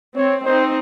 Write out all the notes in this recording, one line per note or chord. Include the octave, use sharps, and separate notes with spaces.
C4 C#5
C4 D#4 C5